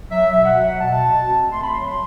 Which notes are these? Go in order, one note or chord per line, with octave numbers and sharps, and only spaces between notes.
F#3 E5
B2
F#5
F#3
B2 A5
B2
C4
A3 C6
B5
F#3 C6